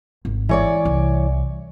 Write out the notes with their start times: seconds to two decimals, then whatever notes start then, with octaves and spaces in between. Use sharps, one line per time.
0.25 G#1
0.49 E3 C#5 D5
0.85 C2